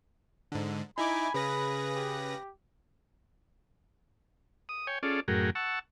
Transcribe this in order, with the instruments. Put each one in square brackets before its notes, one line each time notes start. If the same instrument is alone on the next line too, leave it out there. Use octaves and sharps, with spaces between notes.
[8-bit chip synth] G#2 D3
[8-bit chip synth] D#4 E4 D6 [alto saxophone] G#5 [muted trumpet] B5
[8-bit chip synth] C#3 B4 A#6 [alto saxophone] G#4
[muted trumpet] G4
[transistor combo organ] D#6
C#5 G5 G#5
C#4 F4 G#4 A4 D5
F#2 A2 F#4 G#4 A#4 G5
F#5 A5 C#6 E6